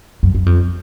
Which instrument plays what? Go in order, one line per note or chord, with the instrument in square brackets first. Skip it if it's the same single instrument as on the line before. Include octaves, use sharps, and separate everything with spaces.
[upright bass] F#2
F#2
F2